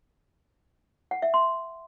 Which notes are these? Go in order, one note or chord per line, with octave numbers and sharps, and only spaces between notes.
F#5
E5
C6